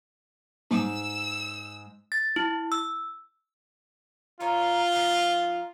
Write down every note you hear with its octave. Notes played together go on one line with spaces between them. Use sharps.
G#2 E6
A6
E4
E6
D#4 F4 A#4 C#5
F3 D#4